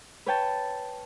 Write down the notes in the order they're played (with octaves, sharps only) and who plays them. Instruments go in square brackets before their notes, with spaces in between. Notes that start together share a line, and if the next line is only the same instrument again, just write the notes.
[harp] B4 C#5 G5 A5